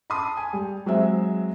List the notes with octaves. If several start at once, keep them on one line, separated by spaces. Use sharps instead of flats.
A5 B5 C6 D#6
G#5
G3
F#3 G#3 C4 C5 E5